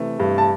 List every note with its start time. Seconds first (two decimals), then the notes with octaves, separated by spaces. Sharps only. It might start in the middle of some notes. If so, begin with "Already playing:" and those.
Already playing: C3 E3 A3
0.20 G2
0.38 A5